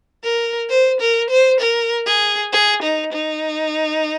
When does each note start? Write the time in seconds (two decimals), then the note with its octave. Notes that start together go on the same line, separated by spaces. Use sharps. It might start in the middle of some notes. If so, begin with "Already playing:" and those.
0.24 A#4
0.70 C5
1.00 A#4
1.30 C5
1.60 A#4
2.07 G#4
2.53 G#4
2.82 D#4
3.12 D#4